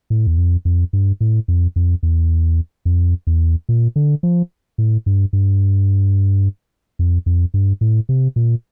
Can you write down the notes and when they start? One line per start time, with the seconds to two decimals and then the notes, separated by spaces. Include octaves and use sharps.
0.10 A2
0.27 E2
0.38 F2
0.65 F2
0.93 G2
1.21 A2
1.48 F2
1.76 F2
2.03 E2
2.85 F2
3.27 E2
3.69 A#2
3.96 D3
4.23 F3
4.78 A2
5.06 G2
5.33 G2
6.99 F2
7.26 F2
7.54 G2
7.81 A2
8.09 C3
8.36 A#2